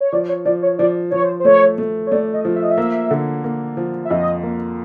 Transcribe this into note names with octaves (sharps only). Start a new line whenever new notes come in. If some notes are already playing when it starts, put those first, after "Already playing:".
C#5
F3 D5
C#5
F3 D5
C#5
F3 D5
F3 C#5
C5
C5
A3 C#5
A3
C#5
A3 D5
D#5
F3
E5
D#5
E5
A#3
D3
A#3
F3
E5
F2 D#5
A#3